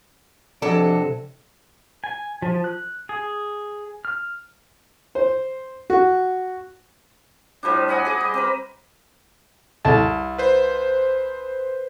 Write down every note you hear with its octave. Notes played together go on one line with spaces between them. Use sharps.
F2 C3 F#3 D4 A4 D5
G#5
F3
F#6
G#4
F6
C5
F#4
A2 F3 G3 D4
D#5 F#5 G#5 B5
G#4 D#5 D6
G3
C4 A#4 B4
C2 A5
B4 C5